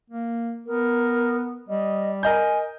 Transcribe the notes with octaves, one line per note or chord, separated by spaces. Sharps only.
A#3
B3 A#4
G3 D#5
A#4 D#5 G#5 G6